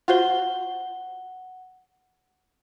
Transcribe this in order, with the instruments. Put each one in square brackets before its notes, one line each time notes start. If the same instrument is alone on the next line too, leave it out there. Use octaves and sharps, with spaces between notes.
[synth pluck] F4 F#4 C5 [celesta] F#5 G7